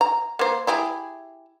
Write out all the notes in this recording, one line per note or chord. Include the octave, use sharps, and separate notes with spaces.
A#5
A#3 C5
E4 G4 G#4